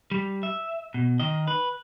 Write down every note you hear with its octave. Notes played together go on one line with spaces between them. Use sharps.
G3
E5
B2
D#3 D#5
B4